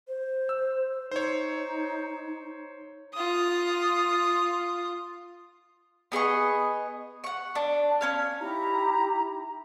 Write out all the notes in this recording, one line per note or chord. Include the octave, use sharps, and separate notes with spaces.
C5
E6
D#4 C5 C#5
F4 D#6
B3 G#4 D#5 C#6
F#5 C#6
D4
C#4 C#5 F5
D#4 E4 G4 A#5